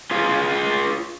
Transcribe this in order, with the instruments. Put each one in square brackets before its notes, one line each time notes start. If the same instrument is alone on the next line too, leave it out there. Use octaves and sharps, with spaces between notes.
[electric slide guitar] F4 G#4 F5